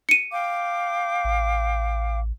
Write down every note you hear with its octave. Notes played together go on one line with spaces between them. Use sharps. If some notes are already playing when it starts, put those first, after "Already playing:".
C#7 D#7
F5 G5 D6
A1